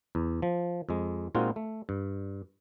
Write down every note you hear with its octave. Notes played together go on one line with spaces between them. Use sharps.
E2
F3
F2 G#3
A#2 G#3 C4 D#4 F4 F#4
A3
G2